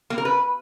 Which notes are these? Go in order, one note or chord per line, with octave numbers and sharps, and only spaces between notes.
A#3
A#4
B4